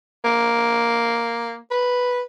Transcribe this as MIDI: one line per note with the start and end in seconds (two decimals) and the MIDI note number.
0.24 1.57 58
1.71 2.21 71